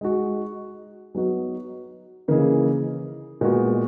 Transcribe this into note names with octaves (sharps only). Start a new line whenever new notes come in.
G#3 D#4 F#4
F#3 B3 D#4 F#4
C#3 E3 A#3 D#4 G#4
A#2 G#3 B3 F#4